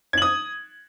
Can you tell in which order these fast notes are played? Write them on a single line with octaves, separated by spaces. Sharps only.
G#6 F#7 D#6